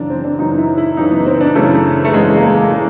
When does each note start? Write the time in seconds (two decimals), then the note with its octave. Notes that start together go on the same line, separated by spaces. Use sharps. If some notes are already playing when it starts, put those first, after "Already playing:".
Already playing: F#2 C#3 E3 D4
0.10 C4
0.25 D4
0.39 F#2 C#3 E3 D#4
0.58 E4
0.77 E4
0.97 F#2 C#3 E3 D#4
1.11 B3
1.26 C4
1.41 D4
1.55 F#2 C#3 E3 A3
2.05 A3
2.14 E2 C#3 E3 G#3
2.37 A#3
2.42 A3
2.71 C#3 E3 G#3